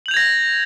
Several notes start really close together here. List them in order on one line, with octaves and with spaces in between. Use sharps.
F#7 G6 F7 G#6 A#6